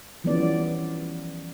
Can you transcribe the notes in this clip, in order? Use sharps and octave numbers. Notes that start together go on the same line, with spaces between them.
E3 F3 G3 B3 C#4 D5